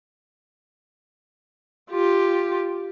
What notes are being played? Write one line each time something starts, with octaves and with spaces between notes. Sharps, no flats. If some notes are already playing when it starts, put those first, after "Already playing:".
F4 G4